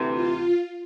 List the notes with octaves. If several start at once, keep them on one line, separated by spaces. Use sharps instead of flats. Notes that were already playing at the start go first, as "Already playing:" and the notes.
Already playing: D2 C3 E3
F4